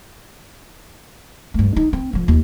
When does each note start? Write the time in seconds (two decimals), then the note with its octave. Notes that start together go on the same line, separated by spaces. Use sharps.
1.54 G2 A3
1.76 D#4
1.93 C4
2.13 D3 F3
2.28 D#2